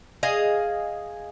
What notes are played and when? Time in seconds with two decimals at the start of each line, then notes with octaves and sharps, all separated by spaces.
0.23 G#4 D#5 F5